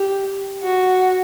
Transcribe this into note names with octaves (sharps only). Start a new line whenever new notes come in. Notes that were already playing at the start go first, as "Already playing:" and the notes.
Already playing: G4
F#4